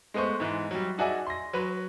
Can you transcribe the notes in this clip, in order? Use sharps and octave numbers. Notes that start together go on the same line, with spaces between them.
G#3 A3 B3 C5 C#6
G#2 E3
F#3 G3
D#4 F#4 G#4 D5 E5 G#5
C6 A#6
F#3 B4